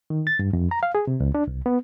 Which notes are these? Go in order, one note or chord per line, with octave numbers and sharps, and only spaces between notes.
D#3
A6
G2
F2
A#5
F5
G#4
C3
C#2
D4
C2
B3